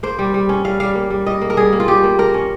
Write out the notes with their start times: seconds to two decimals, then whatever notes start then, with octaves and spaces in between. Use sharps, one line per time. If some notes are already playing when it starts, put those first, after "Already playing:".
0.03 A#3 C5
0.19 G3
0.34 G3
0.49 C#4
0.64 G3 F5
0.80 G3 F5
0.95 A#3
1.11 G3
1.26 G3 D#5
1.42 A#3
1.50 A#4
1.57 G3 G#4
1.73 A#3
1.80 F4
1.88 G3 G4
2.03 A#3
2.18 A#3 A#4
2.34 C#4